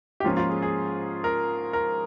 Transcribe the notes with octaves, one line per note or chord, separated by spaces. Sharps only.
G4
G#2 F3 A#3 C#4 F4
F4
G#4
G#4
A#4
A#4